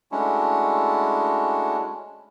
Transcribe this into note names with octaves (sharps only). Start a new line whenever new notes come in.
G#3 A3 C#4 D4 E4 F#4